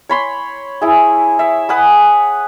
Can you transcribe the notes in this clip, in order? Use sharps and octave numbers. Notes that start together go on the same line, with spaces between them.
C#5 B5 C6
E4 G#4
E5
B4 F#5 G#5 D#6